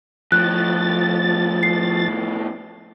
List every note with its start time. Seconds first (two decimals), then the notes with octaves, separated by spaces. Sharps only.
0.32 F2 A2 F3 F#6 A6
1.63 C7